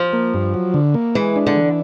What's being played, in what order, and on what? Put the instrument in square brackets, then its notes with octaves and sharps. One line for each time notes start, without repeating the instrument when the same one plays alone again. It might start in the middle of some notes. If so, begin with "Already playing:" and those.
Already playing: [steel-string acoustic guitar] F3
[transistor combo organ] A#3
G2
F#3
D3
A#3
[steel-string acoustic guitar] E3 [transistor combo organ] G#3
[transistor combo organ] D4
[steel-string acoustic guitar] D3
[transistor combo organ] E3